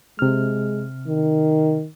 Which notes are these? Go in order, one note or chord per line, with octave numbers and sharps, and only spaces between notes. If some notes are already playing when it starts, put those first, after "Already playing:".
C3 G#3 F6
D#3